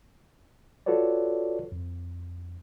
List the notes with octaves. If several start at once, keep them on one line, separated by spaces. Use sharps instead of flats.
F4 F#4 A4 B4 C#5 D5
F2